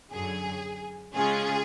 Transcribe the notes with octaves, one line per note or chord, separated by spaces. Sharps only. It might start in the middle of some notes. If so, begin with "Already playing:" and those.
F#2 D3 F#3 G#4
C#3 G#3 C#4 F4 G#4